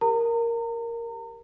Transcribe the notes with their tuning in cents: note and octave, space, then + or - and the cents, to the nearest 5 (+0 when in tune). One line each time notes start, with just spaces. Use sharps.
G4 +30 A#4 +0 A#5 -35